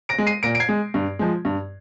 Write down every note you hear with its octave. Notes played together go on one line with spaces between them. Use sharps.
A#6 D7
G#3
C7 D#7
A#2 A#6 D7
D7
G#6 C7
G#3
G2
F3 G#3
G2